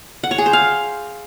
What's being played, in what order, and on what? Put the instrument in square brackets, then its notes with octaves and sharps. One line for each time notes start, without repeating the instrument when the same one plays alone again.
[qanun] F#5
C#5
G#4
C5
F5